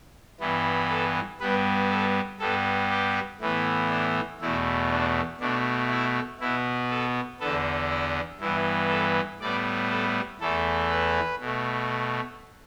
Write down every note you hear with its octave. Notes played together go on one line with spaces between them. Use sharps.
G2 E3 B3
A4
G2 G3 B3 B4
A4
G2 G3 B3 A4
G4
A2 E3 B3
D4
E2 B2 A3 E4
D4
B2 A3 D4
E4
B2 B3 E4
A4
E2 D3 B3 A4
E4
G2 E3 B3 E4
A4
A2 G3 B3 D5
A4
E2 E3 A3 A4
B4
B2
A3